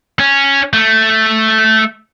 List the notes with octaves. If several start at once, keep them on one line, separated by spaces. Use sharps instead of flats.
C#4
A3